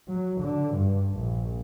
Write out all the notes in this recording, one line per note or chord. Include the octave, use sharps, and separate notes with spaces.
F#3
D3
G2
A#1